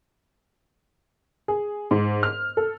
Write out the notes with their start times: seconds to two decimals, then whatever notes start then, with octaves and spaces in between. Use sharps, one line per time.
1.48 G#4
1.91 G#2
2.23 F6
2.57 A4